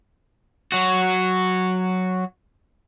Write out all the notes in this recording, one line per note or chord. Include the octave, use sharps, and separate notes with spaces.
F#3 F#4